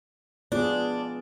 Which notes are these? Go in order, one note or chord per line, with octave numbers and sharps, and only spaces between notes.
B3 D4 F4 G#4